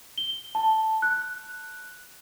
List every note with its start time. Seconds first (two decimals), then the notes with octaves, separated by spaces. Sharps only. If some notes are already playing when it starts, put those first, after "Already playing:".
0.18 G7
0.55 A5
1.02 F#6